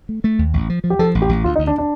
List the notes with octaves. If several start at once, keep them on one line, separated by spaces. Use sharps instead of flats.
A3
A3
D#2
A1
F3
F3
G4
F3 A4
A1
G4
A1
D2 F4
D#4
D2
D4
D4